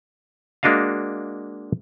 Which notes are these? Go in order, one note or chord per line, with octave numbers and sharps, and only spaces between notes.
G#3 A#3 D4 F#4 D#5 F5